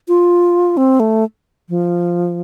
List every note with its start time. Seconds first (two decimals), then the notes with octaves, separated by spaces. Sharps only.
0.08 F4
0.77 C4
1.00 A3
1.69 F3